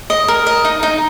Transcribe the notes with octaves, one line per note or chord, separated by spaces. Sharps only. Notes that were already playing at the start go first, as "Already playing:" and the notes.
D#5
A#4
D#5
D#4
D#4